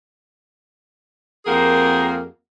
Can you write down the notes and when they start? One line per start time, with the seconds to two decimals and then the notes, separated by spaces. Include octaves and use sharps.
1.46 F2 A#3 G4 G#4 A#4 F#5